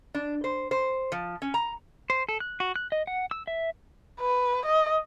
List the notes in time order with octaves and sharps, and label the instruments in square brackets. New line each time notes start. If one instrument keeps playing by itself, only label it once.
[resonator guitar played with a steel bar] D4
C5
C5
F3
C#4
A#5
[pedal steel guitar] C5
A4
F#6
F#4
F#6
D#5
F#5
E6
E5
[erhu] B4
D#5